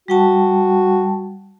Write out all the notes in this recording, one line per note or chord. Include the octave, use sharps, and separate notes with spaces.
G3 F#4 G5 A5